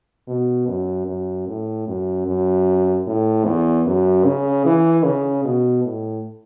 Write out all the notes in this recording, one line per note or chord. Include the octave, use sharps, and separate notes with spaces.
B2
F#2
F#2
A2
F#2
F#2
A2
E2
F#2
C#3
E3
C#3
B2
A2